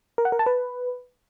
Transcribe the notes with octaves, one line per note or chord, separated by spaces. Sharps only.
A#4
F#5
A#4
A5
B4